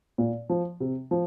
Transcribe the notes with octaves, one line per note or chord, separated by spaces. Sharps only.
A#2
F3
C3
F3